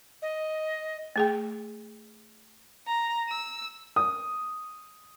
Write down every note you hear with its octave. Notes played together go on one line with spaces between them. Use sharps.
D#5
A3 G#4 G5
A#5
E6
D#6